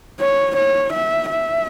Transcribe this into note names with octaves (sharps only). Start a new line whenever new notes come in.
C#5
C#5
E5
E5